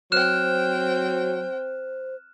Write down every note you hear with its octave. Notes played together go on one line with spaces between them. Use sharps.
F#3 C4 C5 G5 F6 F#6 E7